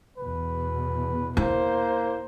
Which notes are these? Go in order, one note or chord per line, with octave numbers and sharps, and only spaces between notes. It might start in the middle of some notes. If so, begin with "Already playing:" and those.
E2 B2 B4
A#3 E4 C5